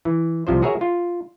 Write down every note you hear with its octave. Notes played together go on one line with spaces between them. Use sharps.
E3
C2 C3 F3 C5
F#4 G#4 A#4 C#5 E5
F4